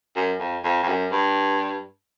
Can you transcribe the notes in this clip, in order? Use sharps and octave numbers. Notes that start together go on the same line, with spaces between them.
F#2
F2
F2
F2
F#2
G2